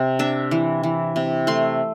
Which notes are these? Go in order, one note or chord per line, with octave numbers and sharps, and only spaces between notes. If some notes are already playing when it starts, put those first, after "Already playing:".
Already playing: C3
D4 E5
E3
E3
C3
A3 C6